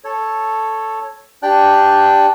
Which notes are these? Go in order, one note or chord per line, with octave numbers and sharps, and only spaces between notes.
A4 C#5
D4 G4 D5 G5 F#6